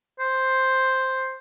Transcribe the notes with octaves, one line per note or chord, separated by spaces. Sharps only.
C5